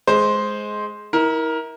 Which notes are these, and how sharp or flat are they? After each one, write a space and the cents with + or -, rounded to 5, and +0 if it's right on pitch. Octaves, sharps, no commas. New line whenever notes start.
G#3 +10 C5 +0
E4 -35 A#4 +10